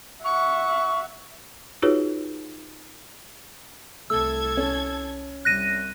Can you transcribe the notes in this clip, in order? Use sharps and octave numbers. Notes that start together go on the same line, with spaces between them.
E5 F#5 C#6
D#4 F4 F#4 G#4 B4 C#5
C2 A3 A4 E6 G#6
C#4
C2 F#6 A#6 D#7